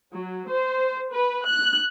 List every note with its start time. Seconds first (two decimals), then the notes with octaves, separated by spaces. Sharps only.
0.14 F#3
0.48 C5
1.12 B4
1.45 F#6